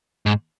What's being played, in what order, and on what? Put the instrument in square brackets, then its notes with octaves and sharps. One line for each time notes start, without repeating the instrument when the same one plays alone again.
[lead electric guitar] G#2